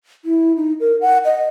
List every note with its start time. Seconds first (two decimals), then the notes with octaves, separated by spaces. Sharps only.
0.25 E4
0.56 D#4
0.80 A#4
1.01 F#5
1.25 D#5